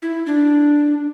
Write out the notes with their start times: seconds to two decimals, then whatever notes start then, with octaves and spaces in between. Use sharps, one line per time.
0.02 E4
0.26 D4